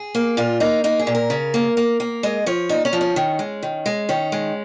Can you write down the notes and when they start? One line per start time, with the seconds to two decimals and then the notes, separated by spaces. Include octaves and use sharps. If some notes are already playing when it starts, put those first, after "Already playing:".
Already playing: G#4
0.15 A#3
0.37 A#2 F4
0.60 A#3 D#4
0.84 A#3 D#4
0.99 G#4
1.07 A#2
1.15 A#4
1.30 C#3
1.54 A#3
1.77 A#3
2.00 A#3
2.23 G#3 D#5
2.46 F3 C#5
2.69 A#2 D#4
2.85 C#4
2.93 F3
3.01 C#4
3.16 D#3
3.39 G#3
3.63 D#3
3.86 G#3
4.09 D#3 C#4
4.32 G#3